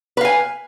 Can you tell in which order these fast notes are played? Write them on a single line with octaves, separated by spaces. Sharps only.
B4 F5 G#5